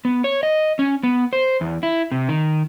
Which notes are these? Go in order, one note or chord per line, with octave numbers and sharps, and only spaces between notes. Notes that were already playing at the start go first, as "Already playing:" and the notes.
B3
C#5
D#5
C#4
B3
C5
E2
E4
C3
D#3